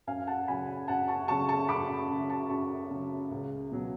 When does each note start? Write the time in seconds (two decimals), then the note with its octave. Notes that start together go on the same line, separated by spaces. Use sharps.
0.07 F#2 F5 G#5
0.27 F#5 A5
0.48 C#3 F#3 G#5 B5
0.88 F#2 F#5 A5
1.08 A5 C#6
1.28 C#3 F#3 A5 C#6
1.49 A5 C#6
1.69 F#2 B5 D6
2.09 C#3 F#3
2.29 A5 C#6
2.50 F#2 A5 C#6
2.91 C#3 F#3
3.31 C#2
3.72 B2 F#3